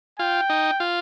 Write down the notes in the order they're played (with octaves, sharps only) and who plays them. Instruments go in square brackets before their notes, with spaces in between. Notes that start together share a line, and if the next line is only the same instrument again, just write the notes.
[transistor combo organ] F4 [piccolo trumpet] G5
[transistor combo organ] D#4
F4